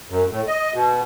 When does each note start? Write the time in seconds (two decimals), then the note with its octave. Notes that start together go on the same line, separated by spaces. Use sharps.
0.10 F#2
0.30 A2
0.48 D#5
0.74 B2